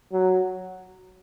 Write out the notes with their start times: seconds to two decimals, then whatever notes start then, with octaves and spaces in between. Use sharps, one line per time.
0.12 F#3